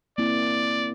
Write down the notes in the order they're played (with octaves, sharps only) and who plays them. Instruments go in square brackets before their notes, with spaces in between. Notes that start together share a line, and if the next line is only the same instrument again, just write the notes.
[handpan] A#3 C4 E4 [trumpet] D5